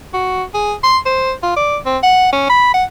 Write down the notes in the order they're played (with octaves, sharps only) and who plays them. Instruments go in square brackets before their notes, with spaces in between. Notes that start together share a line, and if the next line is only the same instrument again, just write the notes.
[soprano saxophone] F#4
G#4
C6
C5
F4
D5
C4
F#5
C#4
B5
F#5